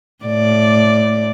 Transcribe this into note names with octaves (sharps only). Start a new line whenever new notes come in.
A2 D5